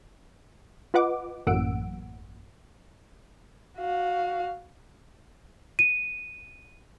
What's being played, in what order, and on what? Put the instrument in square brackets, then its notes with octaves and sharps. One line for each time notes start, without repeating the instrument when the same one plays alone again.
[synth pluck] F4 B4 D#5 F#5 D6
A1 F#2 A#3 F#5 E6 D7
[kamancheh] F#4 F5
[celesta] D#7